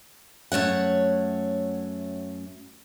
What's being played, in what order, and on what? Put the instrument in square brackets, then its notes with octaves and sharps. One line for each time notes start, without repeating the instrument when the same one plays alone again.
[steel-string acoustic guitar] F#2 A3 C#5 F#5